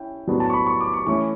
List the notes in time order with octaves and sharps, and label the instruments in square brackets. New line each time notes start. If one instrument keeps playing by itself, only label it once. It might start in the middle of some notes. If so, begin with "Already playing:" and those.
Already playing: [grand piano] C#4 E4 G5
A2 F#3 B3 D4
A5
C#6
B5
C#6
D6
C#6
E3 A3 C#4 E4 C#6